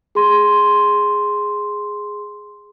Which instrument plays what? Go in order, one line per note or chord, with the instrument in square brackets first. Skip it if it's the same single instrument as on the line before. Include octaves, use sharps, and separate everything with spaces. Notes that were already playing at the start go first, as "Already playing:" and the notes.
[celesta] G#4 C6